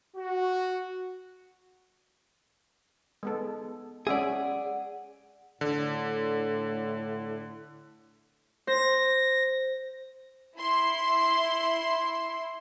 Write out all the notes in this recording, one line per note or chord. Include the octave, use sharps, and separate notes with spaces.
F#4
G#3 B3 A4
G#3 C#4 G#4 D5 E5 F#5
A2 D3
C5 A#6
E4 C6